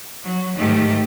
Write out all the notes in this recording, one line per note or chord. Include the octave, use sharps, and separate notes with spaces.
F#3
G#2 D#3 A3 G4